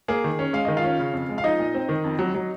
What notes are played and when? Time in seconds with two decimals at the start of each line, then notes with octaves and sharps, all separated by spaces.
0.08 A#3 G#4
0.24 D#3
0.39 C#4
0.53 G#3 F5
0.65 D#3 D#5
0.77 F4 F5
0.84 C#4
0.99 C#3
1.13 F2
1.29 G#3
1.38 F5
1.44 F3 D#4 D#5
1.59 A#2
1.74 C4
1.89 D#3
2.04 F2
2.19 F#3
2.35 F#3